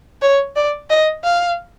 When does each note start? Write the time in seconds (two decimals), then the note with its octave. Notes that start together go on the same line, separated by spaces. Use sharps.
0.22 C#5
0.56 D5
0.90 D#5
1.24 F5